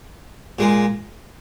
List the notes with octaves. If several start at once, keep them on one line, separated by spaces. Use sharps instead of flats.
A#2 G#3